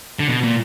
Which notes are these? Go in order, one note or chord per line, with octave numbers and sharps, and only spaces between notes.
D3
B2
A#2